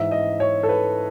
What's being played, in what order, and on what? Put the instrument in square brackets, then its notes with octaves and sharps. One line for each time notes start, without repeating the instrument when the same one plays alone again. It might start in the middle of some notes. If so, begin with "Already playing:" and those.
Already playing: [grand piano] G#2 E3 E5
D#5
C#5
A4
B4